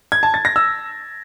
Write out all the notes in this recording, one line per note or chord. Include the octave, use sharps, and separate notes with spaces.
G#6
A5
A6
A#6
E6